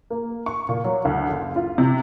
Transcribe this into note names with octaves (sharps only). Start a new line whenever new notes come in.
A#3
C#6
A#2
F#3
D2
F#1
F4
C3